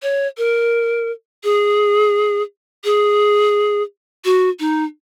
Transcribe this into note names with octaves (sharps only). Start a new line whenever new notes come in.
C#5
A#4
G#4
G#4
F#4
D#4